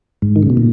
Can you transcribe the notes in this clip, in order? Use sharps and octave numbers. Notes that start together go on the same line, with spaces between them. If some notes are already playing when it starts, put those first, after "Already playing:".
G#2
D#3
C#3
B2
A#2